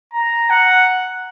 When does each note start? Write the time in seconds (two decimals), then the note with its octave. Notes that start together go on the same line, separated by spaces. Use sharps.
0.14 A#5
0.50 F#5